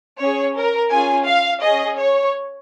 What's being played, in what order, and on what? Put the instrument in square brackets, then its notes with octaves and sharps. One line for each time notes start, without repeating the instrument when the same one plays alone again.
[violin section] C#4 G#4 C#5
A#4
C#4 F4 G#4 G#5
F5
C#4 G#4 D#5
C#5